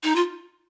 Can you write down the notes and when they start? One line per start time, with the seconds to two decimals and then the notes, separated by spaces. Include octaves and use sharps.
0.03 D#4
0.16 F4